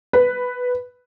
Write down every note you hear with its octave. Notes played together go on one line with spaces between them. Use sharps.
B4